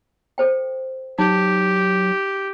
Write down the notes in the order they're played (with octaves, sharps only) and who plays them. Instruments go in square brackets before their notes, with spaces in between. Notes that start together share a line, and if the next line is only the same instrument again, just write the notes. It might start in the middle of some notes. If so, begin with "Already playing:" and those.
[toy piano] A4 C5 G5
[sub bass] F#3 [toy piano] D#4 [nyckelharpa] G4